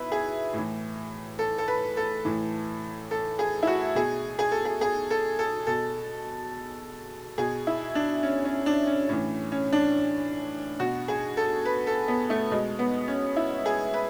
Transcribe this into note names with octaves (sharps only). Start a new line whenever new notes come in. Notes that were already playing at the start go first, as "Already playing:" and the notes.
Already playing: B2 E4 B4
G#4
A2 E3
A4
A4
B4
A4
A2 E3
A4
G#4
E4
F#4
B2 G#4
G#4
A4
G#4
G#4
A4
A4
B2 A4
B2 G#4
E4
D4
C#4
C#4
D4
C#4
A2 E3 C#4
C#4
D4
B2 F#4
G#4
A4
B4
A4
B3
A3
B2 G#3
B3
C#4
E4
G#4
B4